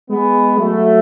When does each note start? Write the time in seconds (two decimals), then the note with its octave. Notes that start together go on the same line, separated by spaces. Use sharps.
0.10 G#3 B3
0.59 F#3 A3